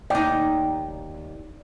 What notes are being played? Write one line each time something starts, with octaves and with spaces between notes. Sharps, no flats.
D#2 D#4 D5 G5